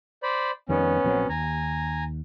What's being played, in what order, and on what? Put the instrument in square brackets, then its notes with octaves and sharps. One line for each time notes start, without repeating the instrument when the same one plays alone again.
[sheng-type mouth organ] C5 D5 B5
[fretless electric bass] F2 D#3 G3 [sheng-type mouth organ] B3 C#4
[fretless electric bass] A#1 F#3 C4
[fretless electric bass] D#2 [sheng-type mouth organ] G#5 A#5